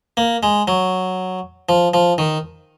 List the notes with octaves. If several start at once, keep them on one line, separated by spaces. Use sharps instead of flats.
A#3
G#3
F#3
F3
F3
D#3